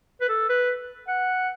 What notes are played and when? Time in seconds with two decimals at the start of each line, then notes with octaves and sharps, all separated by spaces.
0.21 B4
0.29 A4
0.49 B4
1.08 F#5